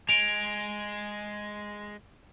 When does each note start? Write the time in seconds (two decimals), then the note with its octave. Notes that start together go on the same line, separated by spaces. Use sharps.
0.09 G#3 D7 F7